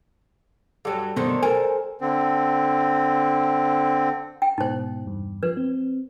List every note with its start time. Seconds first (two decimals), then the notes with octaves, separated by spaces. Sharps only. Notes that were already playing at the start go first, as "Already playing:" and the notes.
0.85 G2 F#3 G4 A4
1.16 F#2 B2 D3 D#3 A3 C5
1.43 A4 A#4 G#5
2.01 D3 C4
4.42 G5
4.58 G#2 B2 D#4 C5
5.06 E2 G2
5.43 F3 B4
5.57 C4